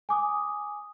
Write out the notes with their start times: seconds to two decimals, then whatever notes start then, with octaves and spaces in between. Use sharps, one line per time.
0.09 G#5 D6 D#6